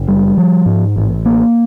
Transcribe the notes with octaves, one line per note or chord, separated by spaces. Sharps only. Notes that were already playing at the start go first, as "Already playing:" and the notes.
Already playing: F#1
G3
F3
G#2
A1
A#3